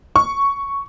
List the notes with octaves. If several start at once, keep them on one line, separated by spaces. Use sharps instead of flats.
C#6